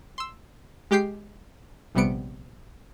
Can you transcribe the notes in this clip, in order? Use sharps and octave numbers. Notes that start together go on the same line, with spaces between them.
C6 E6
G#3 G4 G5 G6 C7
A#1 C3 G3 B3 C#7 D7